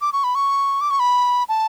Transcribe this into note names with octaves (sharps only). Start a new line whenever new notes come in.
D6
C#6
B5
C#6
D6
C#6
B5
A5